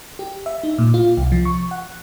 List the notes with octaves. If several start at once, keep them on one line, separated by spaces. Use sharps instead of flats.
G4
E5
D#4
A#2
F4
C2
F3
C#6
F#5